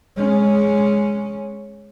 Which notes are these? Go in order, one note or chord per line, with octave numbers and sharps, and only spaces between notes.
G#3 C#4